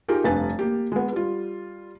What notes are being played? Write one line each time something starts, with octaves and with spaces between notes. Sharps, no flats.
D#4 F4 G4 G#4 A#4
F1 G2 B4 G#5 A6
A#3 G4
G#3 B3
G3 F4